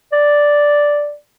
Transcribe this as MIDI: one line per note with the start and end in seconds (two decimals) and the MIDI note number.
0.12 1.14 74